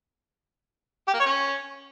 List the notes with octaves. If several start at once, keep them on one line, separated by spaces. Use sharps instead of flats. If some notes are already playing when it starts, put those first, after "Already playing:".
G4
A#3
C#5
C#4